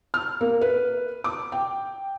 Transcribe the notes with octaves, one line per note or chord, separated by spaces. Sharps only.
F6
A#3
B4
D6
G5